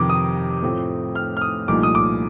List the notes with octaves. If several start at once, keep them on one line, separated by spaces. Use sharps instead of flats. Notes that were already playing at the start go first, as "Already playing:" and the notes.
Already playing: F2 C3 D#3 D6
D#6
A2 F3 A3 C4
F6
F6
D#6
C2 A#2 F3 A3 D#4 D6
D#6
D6